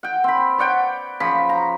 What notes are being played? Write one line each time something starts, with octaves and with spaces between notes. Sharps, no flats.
F#5 G5
C4 B5
C#5 D5 F#5 G5
C#3 F3 B5
A#5